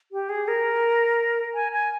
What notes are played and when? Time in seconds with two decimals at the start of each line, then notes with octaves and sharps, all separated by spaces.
0.12 G4
0.29 G#4
0.48 A#4
1.55 G#5
1.72 G#5